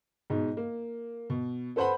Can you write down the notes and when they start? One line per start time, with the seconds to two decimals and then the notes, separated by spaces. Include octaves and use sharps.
0.30 G#2 B2 D#4
0.57 A#3
1.30 B2
1.76 A4 B4 C5 F#5 B5